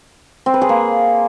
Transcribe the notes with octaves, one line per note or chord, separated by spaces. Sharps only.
C4
B4
G#4
A#3